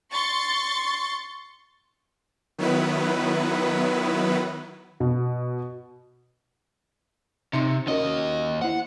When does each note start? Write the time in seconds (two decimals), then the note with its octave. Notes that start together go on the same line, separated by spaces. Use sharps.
0.12 C6 C#6 A6
2.58 D#3 F#3 B3 E4 B4
5.00 B2
7.53 C3 D#4 C6 C#7
7.87 D#2 C#4 F#4 A#4 D#5
8.61 E4 C5 F#5